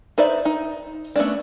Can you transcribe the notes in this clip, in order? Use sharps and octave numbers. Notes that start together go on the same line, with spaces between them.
D#4 B4 C5 D5 E5
D#4
A3 B3 C#4 D4